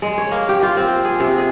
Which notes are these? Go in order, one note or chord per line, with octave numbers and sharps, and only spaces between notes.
G#3
C#5
A#3
G4
F4
C4
G#4
C3
G#4